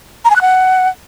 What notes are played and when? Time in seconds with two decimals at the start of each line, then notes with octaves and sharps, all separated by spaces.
0.25 A#5
0.30 G#5
0.36 F#6
0.41 F#5